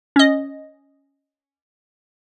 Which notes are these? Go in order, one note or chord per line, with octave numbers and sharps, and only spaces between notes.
C#4 D#5